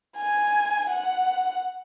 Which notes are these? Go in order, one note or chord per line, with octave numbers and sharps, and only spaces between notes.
G#5
F#5